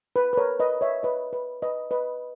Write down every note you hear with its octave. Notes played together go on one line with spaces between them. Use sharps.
B4
B4
A#4 C#5
B4 D#5
C#5 E5
B4 D#5
B4
B4 D#5
B4 D#5